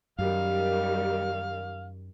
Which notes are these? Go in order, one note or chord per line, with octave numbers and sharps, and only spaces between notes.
F#2 D#3 G3 G4 F5